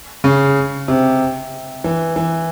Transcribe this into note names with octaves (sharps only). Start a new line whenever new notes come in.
C#3
C3
E3
E3